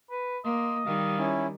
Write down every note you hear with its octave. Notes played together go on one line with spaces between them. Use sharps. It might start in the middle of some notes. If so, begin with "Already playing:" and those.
B4
A#3 D#5 C6
D#3 G3 F5
C#4 E4